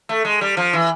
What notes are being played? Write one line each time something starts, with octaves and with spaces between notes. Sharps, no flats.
A3
G#3
G3
F3
E3